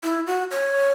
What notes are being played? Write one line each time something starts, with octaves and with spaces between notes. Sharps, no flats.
E4
F#4
C#5